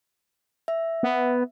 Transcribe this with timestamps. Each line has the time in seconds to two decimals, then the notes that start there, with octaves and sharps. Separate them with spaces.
0.68 E5
1.03 B3